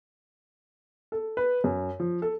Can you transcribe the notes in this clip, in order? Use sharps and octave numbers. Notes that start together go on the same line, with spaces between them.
A4
B4
F#2
F3
A4